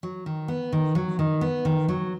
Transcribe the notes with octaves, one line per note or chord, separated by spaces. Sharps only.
F#3
D#3
B3
D#3
F#3
D#3
B3
D#3
F#3